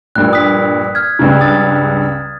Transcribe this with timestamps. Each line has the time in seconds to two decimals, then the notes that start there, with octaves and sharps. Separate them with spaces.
0.16 A#1 G2 A#2 F#6
0.33 D#6 B6
0.95 F6 G#6
1.19 C#2 G2 C#3
1.41 D#6 A6